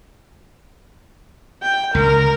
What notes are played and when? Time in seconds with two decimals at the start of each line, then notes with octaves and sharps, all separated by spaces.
1.63 G5
1.95 C#2 A#4